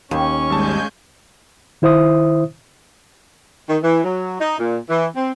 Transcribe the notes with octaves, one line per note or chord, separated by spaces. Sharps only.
D#2 C#4 C#6
G#1 G3 G#3 G#5 A5 G6
D#3 E4 C5 E5 D#6
D#3
E3
F#3
D#4
A#2
E3
C4